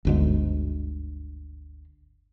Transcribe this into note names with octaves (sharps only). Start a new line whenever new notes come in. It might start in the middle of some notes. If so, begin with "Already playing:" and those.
G1 D2 G#2